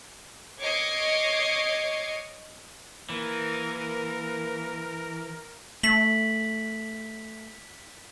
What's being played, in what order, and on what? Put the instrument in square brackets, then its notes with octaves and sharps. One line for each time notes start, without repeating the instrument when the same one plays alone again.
[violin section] C#5 D#5 D6 G#6 C7 C#7
[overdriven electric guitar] E3 [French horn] A#3 [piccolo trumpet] A#4
[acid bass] A3 [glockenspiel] B6 F#7